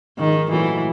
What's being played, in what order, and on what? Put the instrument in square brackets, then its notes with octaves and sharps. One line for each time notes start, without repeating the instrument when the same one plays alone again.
[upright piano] G#2 F3 G#3 [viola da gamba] D#3
[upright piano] A#2 F#3 A3 C#4 [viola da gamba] E3